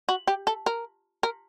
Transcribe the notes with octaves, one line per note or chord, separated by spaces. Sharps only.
F#4
G4
A4
A#4
A#4